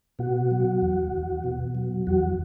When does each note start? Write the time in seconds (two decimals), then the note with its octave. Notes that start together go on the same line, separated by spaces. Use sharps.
0.19 B2 F#4
0.51 F#3
0.82 E2
1.12 E2
1.44 B2
1.75 F#3
2.07 E2 F#4